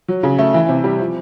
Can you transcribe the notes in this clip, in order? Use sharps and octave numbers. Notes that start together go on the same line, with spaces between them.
F#3
C#3
A3
E3
C3
G3
F3